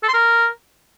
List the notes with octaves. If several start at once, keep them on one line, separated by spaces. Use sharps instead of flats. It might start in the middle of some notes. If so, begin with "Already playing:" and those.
A4
C6
A#4